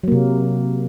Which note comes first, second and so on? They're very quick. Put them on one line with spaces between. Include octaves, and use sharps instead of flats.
F#3 A#3 C3